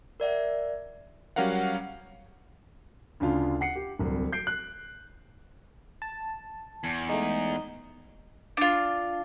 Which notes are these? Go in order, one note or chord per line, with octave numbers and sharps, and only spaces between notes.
A#4 D5 E5 F#5
F#3 G3 C#4 A#4 F5 F#5
D2 C#3 D4 F4
F#5 C7 C#7
G4
D1 C2
G6 C7 D7
F#6
A5
E2
G#3 A3 D#4
D4 F4